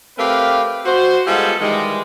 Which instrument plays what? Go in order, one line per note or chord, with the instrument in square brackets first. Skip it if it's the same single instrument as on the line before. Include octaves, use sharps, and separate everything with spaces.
[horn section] A3 C4 G4 A#4 B4 F5
F#4 C5
G3 G#3 B3 F4 G#4 A4
D#3 E3 G3 G#3